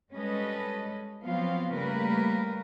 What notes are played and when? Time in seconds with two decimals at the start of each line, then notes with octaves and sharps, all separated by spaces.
0.13 G3 G#3 C#4 A4 B4 D#5
1.24 F3 F#3 B3 C4 F4 F5
1.74 C#3 G3 A3 A#3 A#4 B4